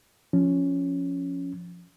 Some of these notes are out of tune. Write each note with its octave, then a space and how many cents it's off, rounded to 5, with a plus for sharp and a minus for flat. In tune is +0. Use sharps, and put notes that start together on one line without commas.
F3 +5 C#4 +5